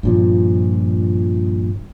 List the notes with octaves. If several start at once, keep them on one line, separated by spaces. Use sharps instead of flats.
G2 A#2 F3